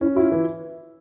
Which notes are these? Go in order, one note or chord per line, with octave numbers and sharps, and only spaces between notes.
C#4 E4
E4 F#4
F4
E3